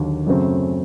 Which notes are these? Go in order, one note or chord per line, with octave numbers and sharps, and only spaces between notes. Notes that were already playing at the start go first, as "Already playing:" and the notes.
Already playing: D#2 D3 F#3 A#3
F#2 C#3 F#3 A3 C4